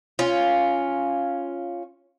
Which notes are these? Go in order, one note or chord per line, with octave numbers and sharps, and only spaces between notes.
C#4 F4